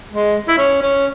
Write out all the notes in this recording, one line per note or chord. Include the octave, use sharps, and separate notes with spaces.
G#3
E4
C#4
C#4